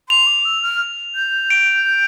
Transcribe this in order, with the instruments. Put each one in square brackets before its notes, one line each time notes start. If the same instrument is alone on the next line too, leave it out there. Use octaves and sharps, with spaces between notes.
[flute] C6 [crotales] F7
[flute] D6
E6
F6
G6
[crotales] D7